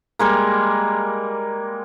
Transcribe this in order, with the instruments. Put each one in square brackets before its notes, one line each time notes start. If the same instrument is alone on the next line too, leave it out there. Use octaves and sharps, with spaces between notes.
[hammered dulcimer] G3 G#3 A#3